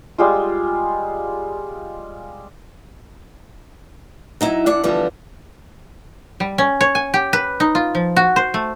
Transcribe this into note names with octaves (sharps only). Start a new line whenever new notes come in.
G3 G#3 F4
F#3 D#4 E4
E3 D4 F#5
D3 E3 F3 G3 B3
G3
C#4
C#5
G#5
G4
B4
D#4
F4
F3
F#4
C5
A3